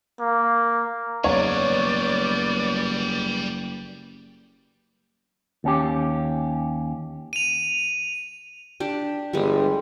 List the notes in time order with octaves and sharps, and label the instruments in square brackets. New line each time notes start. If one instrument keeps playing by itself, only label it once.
[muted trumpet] A#3
[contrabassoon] F#1 [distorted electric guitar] G3 G#4 [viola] B3 D5 [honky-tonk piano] C#5
[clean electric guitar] D#2 C#4 G4
[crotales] D#7 F7
[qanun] D4 G4
[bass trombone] G1 [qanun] G3 G#3